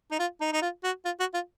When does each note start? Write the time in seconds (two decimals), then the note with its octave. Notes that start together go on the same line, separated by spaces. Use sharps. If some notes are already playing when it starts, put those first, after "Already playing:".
0.11 D#4
0.19 F4
0.41 D#4
0.53 D#4
0.62 F4
0.84 F#4
1.05 F4
1.20 F#4
1.34 F4